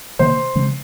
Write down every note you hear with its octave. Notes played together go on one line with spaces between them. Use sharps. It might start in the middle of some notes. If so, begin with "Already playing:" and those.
C3 D#3 A#3 C5
C#3 F3 G#3 C4